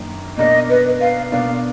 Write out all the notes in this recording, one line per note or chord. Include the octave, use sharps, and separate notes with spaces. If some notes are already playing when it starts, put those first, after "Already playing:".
Already playing: F#2 D#3 A#3 D4
B2 A#3 D4 D#5
B4
F5
B2 A#3 D4 F5